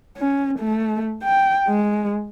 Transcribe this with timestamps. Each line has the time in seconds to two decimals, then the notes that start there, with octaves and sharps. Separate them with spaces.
0.17 C#4
0.59 A3
1.24 G5
1.67 G#3